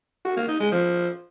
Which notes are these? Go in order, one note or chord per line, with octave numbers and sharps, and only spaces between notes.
F#4
A#3
D#4
G#3
F3